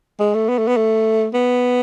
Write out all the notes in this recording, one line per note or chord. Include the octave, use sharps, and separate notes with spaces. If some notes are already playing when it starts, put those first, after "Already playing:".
G#3
A3
B3
A3
B3
A3
B3